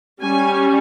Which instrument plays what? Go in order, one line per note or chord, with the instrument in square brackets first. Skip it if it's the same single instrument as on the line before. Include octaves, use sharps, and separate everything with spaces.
[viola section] G3 C#4 G#5